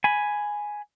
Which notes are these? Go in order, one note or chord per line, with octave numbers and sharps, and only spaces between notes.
G#5 B5